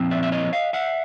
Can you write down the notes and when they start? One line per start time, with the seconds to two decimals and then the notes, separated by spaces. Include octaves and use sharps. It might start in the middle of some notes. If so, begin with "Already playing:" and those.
Already playing: A#2 F3 C4
0.11 D5 E5
0.23 E5
0.32 C#5 D#5
0.53 D#5 F5
0.73 E5 F#5